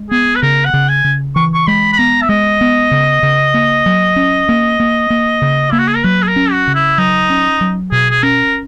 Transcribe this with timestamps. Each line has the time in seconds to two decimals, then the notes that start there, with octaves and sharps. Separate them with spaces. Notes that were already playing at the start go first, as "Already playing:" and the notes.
Already playing: G#3
0.11 B3 G#4
0.36 B4
0.42 C#3 A#4
0.65 F#5
0.73 C#3
0.89 G#5
1.04 C#3
1.36 E3 C#6
1.54 C#6
1.67 G#3 B5
1.93 B5
1.98 B3 A#5
2.22 E5
2.29 G#3 D#5
2.61 B3
2.91 C#3
3.23 C#3
3.54 A#3
3.86 F#3
4.16 C#4
4.49 A#3
4.80 A#3
5.10 A#3
5.42 C#3
5.71 A#3 E4
5.79 F#4
5.88 G#4
5.96 A#4
6.04 F#3 B4
6.23 G#4
6.28 A#4
6.36 C#4
6.51 F#4
6.67 C#3
6.75 E4
6.98 F#3 D#4
7.30 C#4
7.61 F#3
7.92 B2 G#4
8.11 G#4
8.23 C#4 A#4